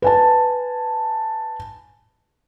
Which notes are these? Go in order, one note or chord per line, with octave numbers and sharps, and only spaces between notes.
B4 G#5 A5